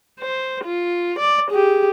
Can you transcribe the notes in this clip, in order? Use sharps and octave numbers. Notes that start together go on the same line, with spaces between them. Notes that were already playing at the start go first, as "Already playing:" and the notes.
C5
F4
D5
G4 G#4